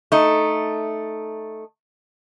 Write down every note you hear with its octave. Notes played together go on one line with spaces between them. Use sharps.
A3 D#4